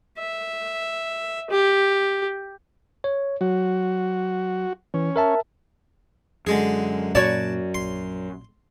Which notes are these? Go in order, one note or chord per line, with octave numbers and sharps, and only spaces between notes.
E5
G4
C#5
F#3 F#4
E3 C#4
A#4 E5 A5
F#2 D3 G#3 G#4
A#2 F#4 C#5 D5 A5
A#1 A#2 C6